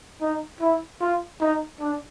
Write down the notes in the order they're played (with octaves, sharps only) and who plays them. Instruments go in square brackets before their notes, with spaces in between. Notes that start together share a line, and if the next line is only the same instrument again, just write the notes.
[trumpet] D#4
E4
F4
D#4
D4